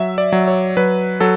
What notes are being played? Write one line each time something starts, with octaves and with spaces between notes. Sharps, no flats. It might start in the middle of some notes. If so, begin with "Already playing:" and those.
Already playing: F#3 E5
D5
F#3
C#5
F#3 B4
F#3 A4